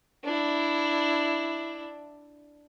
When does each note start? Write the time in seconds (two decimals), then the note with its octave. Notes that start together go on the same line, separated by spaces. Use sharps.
0.24 D4 E4